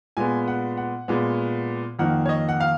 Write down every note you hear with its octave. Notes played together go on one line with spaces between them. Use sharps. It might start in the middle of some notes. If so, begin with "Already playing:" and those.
A#2 G#3 B3 G#5
F#5
F#5
A#2 G#3 B3
F2 D#3 A#3 F#5
C#5
D#5
F#5
F5